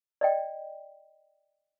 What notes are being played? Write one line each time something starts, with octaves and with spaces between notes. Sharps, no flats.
D5 D#5 G5